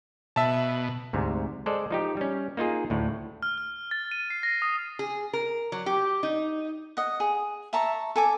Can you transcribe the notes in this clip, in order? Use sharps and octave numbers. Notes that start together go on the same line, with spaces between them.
B2 E5 A5
D2 G#2 C3
G#3 A4 C5 D5
F3 D#4 G4
G3 C#4
A#3 D#4 F4 G#4
D2 A2
F6
F6
A6
D#7
C7
A#6
D#6
G#4
A#4
F#3
G4
D#4
D#5 F#5
G#4
E5 A5 A#5 C#6
A4 G#5 D6